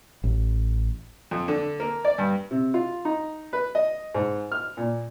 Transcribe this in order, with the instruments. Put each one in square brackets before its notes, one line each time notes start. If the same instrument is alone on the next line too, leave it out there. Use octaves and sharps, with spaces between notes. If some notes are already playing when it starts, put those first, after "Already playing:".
[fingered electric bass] A1
[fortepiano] F2
D3
A#3
D5
G2
C3
F4
D#4
B4
D#5
G#2
F6
A#2